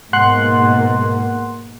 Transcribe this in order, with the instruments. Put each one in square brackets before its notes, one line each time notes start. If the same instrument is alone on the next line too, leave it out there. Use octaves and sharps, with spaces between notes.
[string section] G#2 B2 A#3 [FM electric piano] F#5 C6 F#6